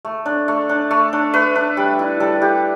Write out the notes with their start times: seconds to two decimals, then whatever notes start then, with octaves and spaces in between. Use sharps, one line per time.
0.05 A3
0.26 D4
0.48 A3
0.69 D4
0.91 A3
1.13 D4
1.34 A3 B4
1.56 D4
1.77 G3
1.99 E4
2.20 G3 A4
2.42 E4 G4